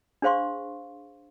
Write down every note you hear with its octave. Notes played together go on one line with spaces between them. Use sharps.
D4 G#4 C5 F5 C6 C#6